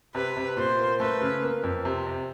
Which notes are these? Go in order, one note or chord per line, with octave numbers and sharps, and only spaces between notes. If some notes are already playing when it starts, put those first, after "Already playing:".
C3 B4
C3
A#2 C5
A#3
A3 B4
C#3
A#3
F2
C3
C3